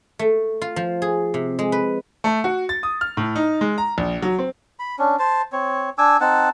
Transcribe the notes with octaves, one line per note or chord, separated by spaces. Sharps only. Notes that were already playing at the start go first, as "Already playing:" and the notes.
A3
F4
F3
G#4
C3
G#3
B4
A3
F#4
A6
D#6
F6
A2
D#4
G#3
A#5
A#1
F#3
C4
B5
C#4 D4
C5 A5
C4 C#5
D4 G#5 D6 E6
C4 D#4 F#5 A5